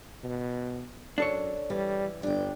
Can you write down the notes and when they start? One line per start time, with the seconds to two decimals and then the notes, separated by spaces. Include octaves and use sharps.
0.24 B2
1.18 F#2 D4 A4 C#5
1.70 E3 G3
2.23 G1 D4 G5